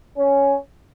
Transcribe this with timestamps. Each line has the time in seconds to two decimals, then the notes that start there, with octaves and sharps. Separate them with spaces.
0.17 C#4